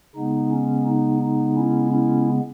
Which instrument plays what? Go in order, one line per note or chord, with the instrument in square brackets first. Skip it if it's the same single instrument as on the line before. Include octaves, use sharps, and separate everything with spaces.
[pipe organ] C#3 G#3 B3 D#4
C#4
D#4
D#4
C#4 E4
C#4 E4